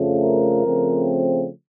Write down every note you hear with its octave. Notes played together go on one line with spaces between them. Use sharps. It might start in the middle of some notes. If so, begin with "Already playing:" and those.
Already playing: F2 C#3 F3 A3
A#4
C#3 F3 A3 C4